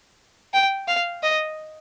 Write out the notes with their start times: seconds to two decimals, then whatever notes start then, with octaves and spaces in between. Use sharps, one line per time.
0.54 G5
0.88 F5
1.23 D#5